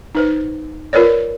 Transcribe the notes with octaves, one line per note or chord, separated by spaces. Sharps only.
D#4 B4 C5
F4 A#4 B4 C#5 D5